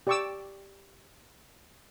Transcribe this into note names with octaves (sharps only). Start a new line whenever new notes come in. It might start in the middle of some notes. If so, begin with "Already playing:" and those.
G4 D5 G5 C#6 D6 E6